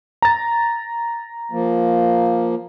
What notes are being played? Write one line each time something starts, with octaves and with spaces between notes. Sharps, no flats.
A#5 A6
F3 A#3